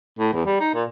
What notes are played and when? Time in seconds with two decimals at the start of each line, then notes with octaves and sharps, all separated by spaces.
0.19 A2
0.33 E2
0.46 G3
0.60 D#4
0.74 A#2